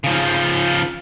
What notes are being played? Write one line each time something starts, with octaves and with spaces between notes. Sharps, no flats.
C#3 F3